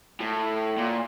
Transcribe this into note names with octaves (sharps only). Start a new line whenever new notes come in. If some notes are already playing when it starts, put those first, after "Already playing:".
A2
A#2